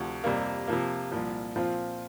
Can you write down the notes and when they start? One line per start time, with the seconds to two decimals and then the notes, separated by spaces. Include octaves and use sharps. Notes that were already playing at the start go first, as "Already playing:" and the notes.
Already playing: D2 C3 F3
0.24 F2 C3 G3 A#3
0.68 C3 F3 A#3
1.12 C2 A#2 F3
1.56 A#2 F3 C4 F4